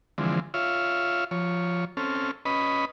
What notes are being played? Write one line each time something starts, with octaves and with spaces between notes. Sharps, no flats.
D3 E3 F3 G#3 C4
F4 C#5 E5 F5
F3 C#5
C4 C#4 A4 F6
C#4 B4 D#5 B5